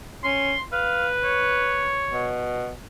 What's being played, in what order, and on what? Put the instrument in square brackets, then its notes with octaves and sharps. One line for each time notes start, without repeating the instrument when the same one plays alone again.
[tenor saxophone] C#4 [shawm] C6
[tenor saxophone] B4 [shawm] F5
[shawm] C#5
[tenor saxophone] B2